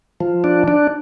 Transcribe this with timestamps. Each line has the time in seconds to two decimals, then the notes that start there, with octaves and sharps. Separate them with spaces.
0.20 F3
0.44 D4
0.68 D4